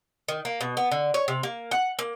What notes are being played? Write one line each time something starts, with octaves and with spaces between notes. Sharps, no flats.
D#3
A#3
B2
B3
D3
C#5
C3
A#3
F#5
A#3